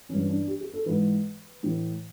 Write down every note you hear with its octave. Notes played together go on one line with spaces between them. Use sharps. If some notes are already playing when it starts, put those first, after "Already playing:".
G2 E3 C#4
D4
G4
G#4
A4
G#2 E3 B4
A2 E3